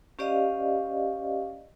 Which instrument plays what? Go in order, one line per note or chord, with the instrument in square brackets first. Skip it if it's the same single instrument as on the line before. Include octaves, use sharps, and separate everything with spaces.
[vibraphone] C#4 G4 C5 D5 D#5 F5